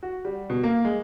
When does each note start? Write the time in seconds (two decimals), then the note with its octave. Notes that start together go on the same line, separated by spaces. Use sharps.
0.03 F#4
0.25 G3
0.50 B2
0.63 A#3
0.85 G#3